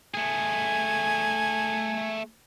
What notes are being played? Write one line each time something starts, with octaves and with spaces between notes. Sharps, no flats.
A3 G#4 G#5